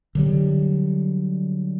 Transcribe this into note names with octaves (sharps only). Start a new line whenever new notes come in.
D3 F#3 G3